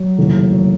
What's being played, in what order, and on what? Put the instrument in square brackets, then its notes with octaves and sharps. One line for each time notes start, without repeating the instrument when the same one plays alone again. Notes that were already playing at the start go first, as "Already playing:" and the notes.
Already playing: [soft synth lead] F#3
[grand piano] F1 D#2 C#3 E3 A3
[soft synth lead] F#3